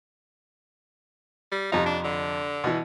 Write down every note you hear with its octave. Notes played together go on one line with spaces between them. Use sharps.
G3
F2 C3 D#4 F4
D4
D3
B2 E3